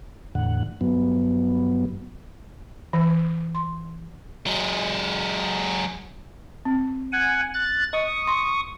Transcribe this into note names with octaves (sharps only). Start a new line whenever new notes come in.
E2 A2 D3 F#5
G2 F#3 B3
E3
C6
F#3 G#3
C4
F#5 G#5
F#6 A6
D#5 C#6 D#6
C6